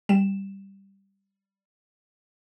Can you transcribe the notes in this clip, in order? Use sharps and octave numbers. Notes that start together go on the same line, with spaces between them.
G3 E7